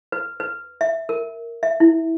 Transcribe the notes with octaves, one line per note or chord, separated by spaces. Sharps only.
B4
B4
E5
A#4
E5
E4